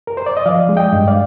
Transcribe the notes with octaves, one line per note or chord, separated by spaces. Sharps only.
A#4
C5
D5
D#5
F3 D5 F5
G#3
D#5 G5
G2
D5 F5